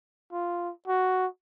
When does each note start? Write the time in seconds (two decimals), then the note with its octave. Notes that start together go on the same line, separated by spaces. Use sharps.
0.32 F4
0.88 F#4